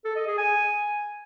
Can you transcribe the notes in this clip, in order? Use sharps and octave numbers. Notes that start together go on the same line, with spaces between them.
A4
D#5
G#4
G#5